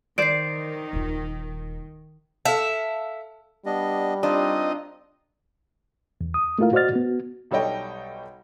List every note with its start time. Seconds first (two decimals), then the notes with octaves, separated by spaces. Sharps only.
0.18 D#3 C5 D5 C7 D7
0.93 D#1 F4
2.45 A4 E5 F5 A5
3.66 G3 B3 D4 D#5
4.23 C4 D4 D#4 F4 D#5
6.21 E2
6.34 D#6
6.59 A3 A#3 E4 F4 A#4 F5
6.73 F#4 C5 D5 D#5 F6 A6
6.93 B3 F#4
7.51 B1 G3 A4 C#5 D#5 G5